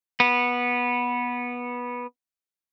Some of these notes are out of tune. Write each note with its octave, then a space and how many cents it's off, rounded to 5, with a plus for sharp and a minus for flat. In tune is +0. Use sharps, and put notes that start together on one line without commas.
B3 -15